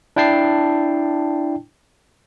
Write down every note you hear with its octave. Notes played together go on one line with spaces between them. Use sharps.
D4 E4 G5 A5 C7